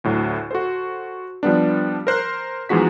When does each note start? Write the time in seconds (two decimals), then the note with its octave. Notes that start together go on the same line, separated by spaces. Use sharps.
0.04 D2 A2 F#3
0.51 F#4 A4 C5
1.43 F3 G3 B3 D4
2.07 A#4 C5 F#6
2.69 E2 F3 G#3 D#4 F#4 B6